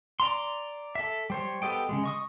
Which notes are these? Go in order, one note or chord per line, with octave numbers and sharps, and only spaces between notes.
D5 A#5 C6
A4 E5
G3 C5 C#5
B3 G4 A4 D#5 G5
C#3 G3 G#3
D#5 C#6 D#6